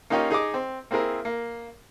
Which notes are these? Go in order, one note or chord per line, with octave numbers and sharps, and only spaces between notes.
A#3 C#4 D#4 F4 G4 C#5
D#4 G#4 D#5 D6
C4
A#3 C4 E4 G#4 A#4
A#3